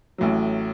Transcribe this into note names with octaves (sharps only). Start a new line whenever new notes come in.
A1 A2 F#3